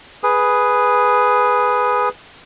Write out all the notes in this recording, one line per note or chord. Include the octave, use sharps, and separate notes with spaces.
G#4 B4